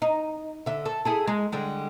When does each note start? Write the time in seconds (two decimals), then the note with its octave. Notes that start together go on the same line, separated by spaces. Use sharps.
0.02 D#4
0.66 D3 E5
0.86 A4
1.05 E4 G#4 A4
1.27 G#3
1.52 D3 G3 G#3